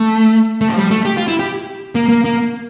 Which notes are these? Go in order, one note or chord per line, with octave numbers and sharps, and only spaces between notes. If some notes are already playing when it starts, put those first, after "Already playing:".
Already playing: A3
A3
F3
G3
A3
G4
F4
E4
G4
A#3
A#3
A#3